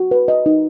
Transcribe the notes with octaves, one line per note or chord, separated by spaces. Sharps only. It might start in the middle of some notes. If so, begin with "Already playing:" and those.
Already playing: F#4
B4
D#5
D#4